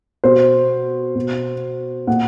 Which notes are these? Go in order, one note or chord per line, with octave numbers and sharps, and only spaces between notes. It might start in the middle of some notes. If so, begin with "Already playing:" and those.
B2 C5
B2
A#2 F#5